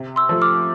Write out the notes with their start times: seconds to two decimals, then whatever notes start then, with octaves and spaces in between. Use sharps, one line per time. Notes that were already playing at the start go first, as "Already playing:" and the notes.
Already playing: C3
0.16 C6 E6
0.29 F3 A3
0.42 D6 F6